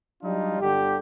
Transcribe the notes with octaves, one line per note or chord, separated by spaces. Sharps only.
F#3 G3 D4 D#4 F4
G1 D3 G4